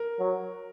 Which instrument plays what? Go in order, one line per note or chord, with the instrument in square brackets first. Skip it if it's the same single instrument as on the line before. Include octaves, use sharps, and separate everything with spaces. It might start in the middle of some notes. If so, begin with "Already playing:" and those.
Already playing: [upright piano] A#4
[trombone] F#3